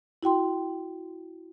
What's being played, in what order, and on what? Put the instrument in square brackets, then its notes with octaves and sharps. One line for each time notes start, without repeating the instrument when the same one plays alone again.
[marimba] E4 F#4 G5 C6